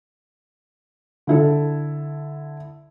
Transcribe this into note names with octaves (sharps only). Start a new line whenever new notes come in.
D3 E4 A4